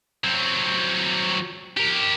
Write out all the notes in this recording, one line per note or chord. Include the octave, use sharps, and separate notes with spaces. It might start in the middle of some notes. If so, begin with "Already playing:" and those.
F#3 C4
G4 A#4